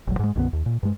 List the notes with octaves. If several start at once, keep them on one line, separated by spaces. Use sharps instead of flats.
F1 A#1 F#3
G#2 G#3
B1 F#2 D3 B3
D#2
A#2
G2 G#3